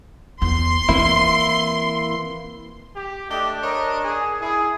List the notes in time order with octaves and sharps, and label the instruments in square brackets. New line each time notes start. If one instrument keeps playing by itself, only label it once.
[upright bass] E2 [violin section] C6
[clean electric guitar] E3 A#3 E4 [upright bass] C4
[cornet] G4
[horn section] A3 G4 D#5 [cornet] D4
[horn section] A#4 C#5 D#5
[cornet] G#4
[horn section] E4 [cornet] G#4